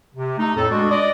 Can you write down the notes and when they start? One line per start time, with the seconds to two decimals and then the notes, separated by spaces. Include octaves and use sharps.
0.16 C3
0.38 A3 D#4
0.56 F2 A2 A4
0.70 G#3 D4 F#4
0.91 D5 D#5